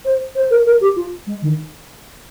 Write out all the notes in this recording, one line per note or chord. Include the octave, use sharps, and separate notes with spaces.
C5
C5
A#4
A#4
G4
F4
G#3
D#3